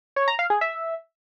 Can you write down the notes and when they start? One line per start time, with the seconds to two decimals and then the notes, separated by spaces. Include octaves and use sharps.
0.16 C#5
0.28 A#5
0.39 F5
0.50 G#4
0.61 E5